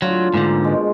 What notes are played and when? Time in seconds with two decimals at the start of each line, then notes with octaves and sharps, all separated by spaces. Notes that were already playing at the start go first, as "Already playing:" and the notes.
0.02 A2 D3 F#3 F4
0.34 G#2 D3 A#3 C5
0.64 B2 G#3